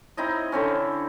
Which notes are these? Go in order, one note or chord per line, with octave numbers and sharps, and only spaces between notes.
C4 D#4 E4 D#5
D3 C4 C#4